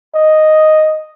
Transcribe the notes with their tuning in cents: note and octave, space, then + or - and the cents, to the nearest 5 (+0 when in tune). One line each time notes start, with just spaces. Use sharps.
D#5 +0